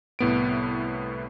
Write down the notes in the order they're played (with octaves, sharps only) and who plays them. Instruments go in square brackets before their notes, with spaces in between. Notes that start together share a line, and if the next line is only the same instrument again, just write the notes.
[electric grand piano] C2 A2 B3 D7